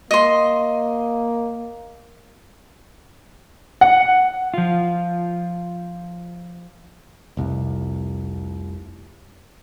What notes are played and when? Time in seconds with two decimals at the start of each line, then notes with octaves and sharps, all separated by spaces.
0.11 A#3 D#5 C6
3.81 F#5
4.54 F3 F4
7.37 F1 C2